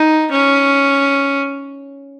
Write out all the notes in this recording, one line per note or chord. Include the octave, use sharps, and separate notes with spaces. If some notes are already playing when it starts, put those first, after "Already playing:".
Already playing: D#4
C#4